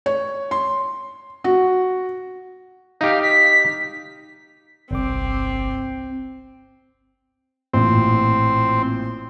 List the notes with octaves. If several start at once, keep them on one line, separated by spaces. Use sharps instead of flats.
C#5
C6
F#4
D#4 G4 F5
B6
G1 C2 C4 D6
A1 A#2 C4